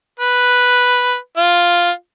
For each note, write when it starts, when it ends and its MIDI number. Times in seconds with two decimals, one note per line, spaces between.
0.20 1.16 71
1.37 1.91 65